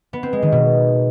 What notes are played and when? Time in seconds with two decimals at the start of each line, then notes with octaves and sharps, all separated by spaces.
0.13 B3
0.23 C4
0.33 G#3
0.42 D#3
0.52 B2